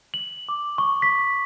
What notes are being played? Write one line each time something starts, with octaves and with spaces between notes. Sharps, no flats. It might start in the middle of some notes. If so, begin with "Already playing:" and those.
F#7
D6
C#6
B6